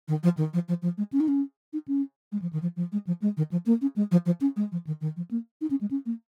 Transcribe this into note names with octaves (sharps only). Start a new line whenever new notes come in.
D#3
F3
D#3
F3
F3
F3
G#3
C#4
D#4
C#4
D#4
C#4
G#3
F3
D#3
F3
F3
G#3
F3
G#3
D#3
F3
A#3
C#4
G#3
F3
F3
C#4
G#3
F3
D#3
D#3
F3
A#3
D#4
C#4
G#3
C#4
A#3